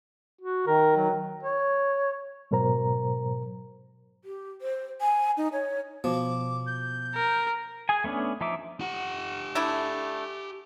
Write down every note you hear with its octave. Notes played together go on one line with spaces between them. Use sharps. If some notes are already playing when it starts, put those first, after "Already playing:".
F#4
D#3 A#4
F#3
C#5
G#2 B2 F#3 A#4 C5 A#5
G4
C5
G#5
D#4
C#5
B2 F3 D6
G6
A#4
G#4 G#5
A3 B3 C#4 D4
F3 D#4 E5 D6
G4 F#5
A3 D4 E4